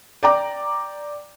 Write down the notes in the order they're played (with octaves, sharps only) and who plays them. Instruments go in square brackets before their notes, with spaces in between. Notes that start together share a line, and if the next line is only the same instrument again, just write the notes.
[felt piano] D5 G5 A#5 D6